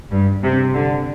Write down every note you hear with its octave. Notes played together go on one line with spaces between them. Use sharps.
G2
C3
D3